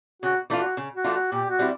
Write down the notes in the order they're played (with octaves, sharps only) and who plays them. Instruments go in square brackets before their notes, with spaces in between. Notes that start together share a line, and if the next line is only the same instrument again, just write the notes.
[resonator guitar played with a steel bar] C#3 [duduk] F#4
[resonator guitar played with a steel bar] E3 A3 D4 F4
[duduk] F#4
[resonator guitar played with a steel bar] C#3
[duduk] F#4
[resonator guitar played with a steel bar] E3 A3 D4 F4
[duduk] F#4
[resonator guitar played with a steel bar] A#2 [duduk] G4
[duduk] F#4
[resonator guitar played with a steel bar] G3 C4 E4